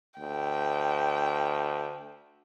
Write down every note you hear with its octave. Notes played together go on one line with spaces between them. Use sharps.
D2 G5